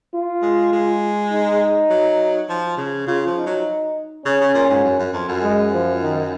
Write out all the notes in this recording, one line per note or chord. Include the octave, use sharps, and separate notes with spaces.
F4
G#3
G#3
D#4
F#3
F3
C#3
C#3 F4
F3
D#4
F#3
C#3 C#4
C#3
A#2
G#2
F#2
F#2
F2
F#2
G#3
F3
D#3